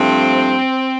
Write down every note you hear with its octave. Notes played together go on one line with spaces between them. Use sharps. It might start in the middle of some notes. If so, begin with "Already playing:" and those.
Already playing: G2 F3 A3 C4